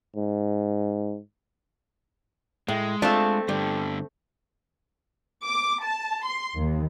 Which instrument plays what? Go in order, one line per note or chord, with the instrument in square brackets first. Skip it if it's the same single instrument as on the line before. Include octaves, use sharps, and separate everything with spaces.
[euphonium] G#2
[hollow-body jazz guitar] A2 [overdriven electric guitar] G#3
[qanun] A3 C4 A4 [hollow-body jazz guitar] D4 F4
[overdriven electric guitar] G2 D3 [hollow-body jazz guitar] G3
[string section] D6
A5
C6
D#2